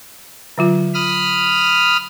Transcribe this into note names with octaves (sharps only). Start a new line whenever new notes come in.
D3 F#3 F4
B5 D#6 F6